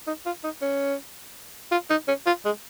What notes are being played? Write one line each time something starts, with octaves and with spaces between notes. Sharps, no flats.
D#4
F4
D#4
C#4
F4
D#4
C#4
F4
G#3